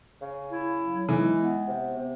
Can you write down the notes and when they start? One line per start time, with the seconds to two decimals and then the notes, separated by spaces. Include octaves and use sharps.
0.22 C#3
0.51 E4
0.79 F#3
1.08 E3 G#3
1.38 B3
1.66 C3
1.95 C3